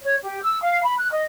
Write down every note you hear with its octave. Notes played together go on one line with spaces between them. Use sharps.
C#5
G4
E6
F5
B5
F#6
D#5